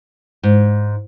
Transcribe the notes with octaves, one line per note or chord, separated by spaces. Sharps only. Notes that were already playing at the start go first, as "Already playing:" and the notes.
G#2